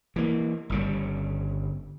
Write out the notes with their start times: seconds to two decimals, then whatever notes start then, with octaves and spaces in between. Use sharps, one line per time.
0.16 E3 A#3
0.70 G1 C#3 G3